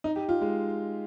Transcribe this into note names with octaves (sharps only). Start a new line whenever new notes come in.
D#4
G4
F4
G#3